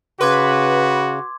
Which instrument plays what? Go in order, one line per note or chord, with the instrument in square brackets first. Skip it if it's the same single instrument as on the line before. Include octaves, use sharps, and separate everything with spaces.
[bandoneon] C#3 [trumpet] F#4 [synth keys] B4 [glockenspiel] C6 D6 G#6